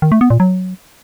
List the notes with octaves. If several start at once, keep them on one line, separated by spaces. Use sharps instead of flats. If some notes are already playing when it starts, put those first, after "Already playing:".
D#3
A3
B3
A#2
F#3